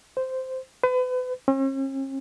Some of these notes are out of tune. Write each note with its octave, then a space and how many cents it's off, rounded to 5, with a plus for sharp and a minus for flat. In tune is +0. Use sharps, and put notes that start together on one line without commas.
C5 -10
B4 +35
C#4 -45